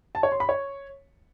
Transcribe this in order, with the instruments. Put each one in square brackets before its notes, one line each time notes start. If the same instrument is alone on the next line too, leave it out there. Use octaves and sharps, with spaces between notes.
[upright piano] A5
C#5
C6
B5
C#5